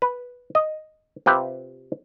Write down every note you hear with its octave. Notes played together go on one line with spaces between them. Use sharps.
B4
D#5
C3 F4 G4 B4